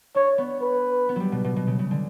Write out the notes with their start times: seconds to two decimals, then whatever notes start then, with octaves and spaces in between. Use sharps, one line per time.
0.15 D4 C#5
0.38 B3
0.62 B4
1.09 B3
1.16 F#3 G3
1.32 B2
1.45 B2
1.56 B2
1.67 C#3
1.79 C#3
1.91 D3